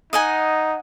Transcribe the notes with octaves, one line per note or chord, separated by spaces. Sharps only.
D#4 D#5 F#5 G#5